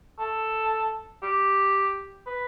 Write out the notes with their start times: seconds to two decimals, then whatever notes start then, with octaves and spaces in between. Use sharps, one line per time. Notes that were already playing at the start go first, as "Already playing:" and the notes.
0.19 A4
1.22 G4
2.26 B4